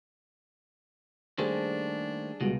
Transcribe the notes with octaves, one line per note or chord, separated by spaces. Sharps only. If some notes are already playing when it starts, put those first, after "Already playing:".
D#3 G3 A3 A#3 D4 G#4 A4 C5
C#2 B2 G3 G#3 F#4